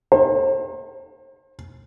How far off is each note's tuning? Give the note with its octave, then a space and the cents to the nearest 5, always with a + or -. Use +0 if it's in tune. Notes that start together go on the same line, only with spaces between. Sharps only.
C5 +40